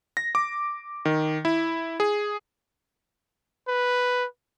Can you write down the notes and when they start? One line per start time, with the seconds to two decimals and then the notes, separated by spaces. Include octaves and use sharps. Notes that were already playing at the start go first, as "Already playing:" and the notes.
0.17 A#6
0.35 D6
1.05 D#3
1.45 E4
2.00 G#4
3.68 B4